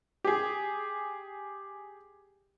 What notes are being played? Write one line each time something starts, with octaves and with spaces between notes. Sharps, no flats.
G4 G#4